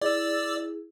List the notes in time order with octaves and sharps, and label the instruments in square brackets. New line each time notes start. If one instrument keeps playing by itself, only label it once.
[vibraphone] E4 G#4 [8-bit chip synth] D5 E6